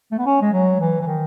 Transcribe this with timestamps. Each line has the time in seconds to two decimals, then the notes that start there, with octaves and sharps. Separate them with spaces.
0.12 A3
0.18 B3
0.26 C#4
0.41 G#3
0.53 F#3
0.80 E3
1.01 E3
1.06 D#3